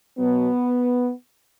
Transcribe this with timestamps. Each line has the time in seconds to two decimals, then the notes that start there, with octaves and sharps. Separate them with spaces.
0.17 B2 F#3 B3